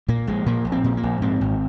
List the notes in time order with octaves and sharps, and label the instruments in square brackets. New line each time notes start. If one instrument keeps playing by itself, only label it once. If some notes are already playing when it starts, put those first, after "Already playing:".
[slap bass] A#2 A#3
A#1 G#3
A#2 A#3
A#1
C4
A#2
A#3
A#1
G#2 C4
G#1